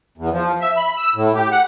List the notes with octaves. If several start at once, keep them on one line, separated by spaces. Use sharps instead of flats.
E2
F3
E5
B5
E6
A2
G4
F#5